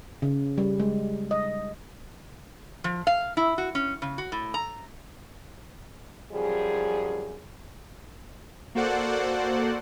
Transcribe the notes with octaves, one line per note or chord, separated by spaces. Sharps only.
C#3
G3
G#3
D#5
F3
F5
E4
F#4
C#4
C#3
F#4
A2
A#5
F#2 F3 G3 G#4
A#3 F#4 A4 C5 D5 F#5